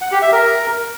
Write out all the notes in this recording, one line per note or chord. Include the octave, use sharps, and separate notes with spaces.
F#5
G4
E5
A#4